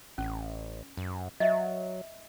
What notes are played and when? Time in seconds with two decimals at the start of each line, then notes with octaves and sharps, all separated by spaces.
0.18 A1 C#4
0.97 F#2
1.40 F#3 D#5 E5